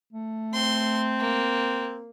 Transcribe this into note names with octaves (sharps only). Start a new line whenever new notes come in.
A3
C4 C6
A#3